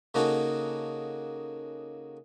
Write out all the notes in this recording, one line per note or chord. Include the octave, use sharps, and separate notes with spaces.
C#3 A#3 D#4 F#4 A4